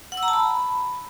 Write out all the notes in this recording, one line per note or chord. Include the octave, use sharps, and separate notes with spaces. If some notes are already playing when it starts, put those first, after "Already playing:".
F#5
E6
A#5
A5
B5